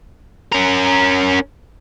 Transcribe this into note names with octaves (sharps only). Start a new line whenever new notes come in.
C#4 A#4